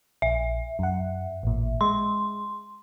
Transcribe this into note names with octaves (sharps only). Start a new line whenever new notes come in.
A#1 E5
F#2 F#5
A1 A#2
G#3 C6